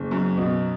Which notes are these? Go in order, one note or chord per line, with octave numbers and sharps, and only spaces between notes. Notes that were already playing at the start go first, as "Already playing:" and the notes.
Already playing: F#1
F#2
B2